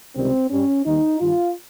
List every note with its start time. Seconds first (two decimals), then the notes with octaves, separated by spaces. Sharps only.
0.16 C#2 C3 D#3 G3 C4
0.50 G2 G3 C#4
0.85 D#2 D#3 G3 D#4
1.20 G2 D#3 G3 F4